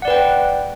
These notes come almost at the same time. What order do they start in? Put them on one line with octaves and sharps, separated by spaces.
F#5 D5 B4 G5